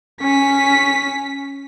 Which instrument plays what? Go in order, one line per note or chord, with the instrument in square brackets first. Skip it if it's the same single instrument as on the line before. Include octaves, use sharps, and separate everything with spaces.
[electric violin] C#4 B6